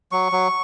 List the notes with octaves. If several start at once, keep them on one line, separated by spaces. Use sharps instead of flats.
F#3 C#6
F#3